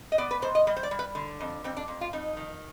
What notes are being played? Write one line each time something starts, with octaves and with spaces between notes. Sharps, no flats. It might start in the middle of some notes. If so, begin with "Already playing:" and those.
D#5
B3 D5
B4
G#2 C5
D#5
G3 D#5
C5
D5
G3
B4
D3
F2
F2 C4
D4
F2
F4
F2 D#4
D#3